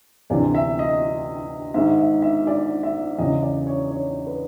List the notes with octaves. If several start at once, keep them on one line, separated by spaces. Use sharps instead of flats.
D2 C3 E3 D5
E5
D#5
G#2 D#3 G#3 E5
E5
E5
D5
E5
E2 C#3 E3 D#5
D5
C#5
C#5
B4